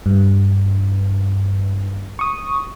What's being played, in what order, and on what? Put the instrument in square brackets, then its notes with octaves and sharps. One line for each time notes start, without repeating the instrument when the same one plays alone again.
[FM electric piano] G2
C#6 D#6